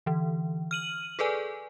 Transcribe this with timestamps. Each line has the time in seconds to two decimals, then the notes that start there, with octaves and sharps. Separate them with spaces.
0.06 D3 E3
0.71 F6 D#7 F#7
1.19 G#4 A4 B4 D5 G#5